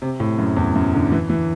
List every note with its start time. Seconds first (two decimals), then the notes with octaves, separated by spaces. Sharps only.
0.02 C3
0.20 A2
0.38 F#2
0.56 E2
0.75 F#2
0.94 D3
1.12 E3
1.30 E3